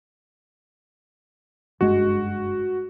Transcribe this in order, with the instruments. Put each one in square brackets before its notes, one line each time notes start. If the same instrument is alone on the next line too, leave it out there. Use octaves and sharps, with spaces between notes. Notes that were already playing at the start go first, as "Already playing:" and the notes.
[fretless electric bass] F#1 G2 G#3 [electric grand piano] F#4